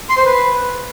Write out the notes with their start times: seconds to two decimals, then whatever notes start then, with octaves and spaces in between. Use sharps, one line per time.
0.10 C6
0.17 C5
0.25 B4